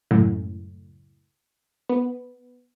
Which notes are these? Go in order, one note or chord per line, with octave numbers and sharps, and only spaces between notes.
C#2 F#2 A2
B3